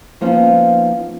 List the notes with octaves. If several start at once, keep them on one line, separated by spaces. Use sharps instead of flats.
F3 A#3 B3 C#4 D#4 F4